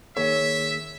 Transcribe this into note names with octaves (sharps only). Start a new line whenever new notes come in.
D#3 A#3 G#4 C#5 E5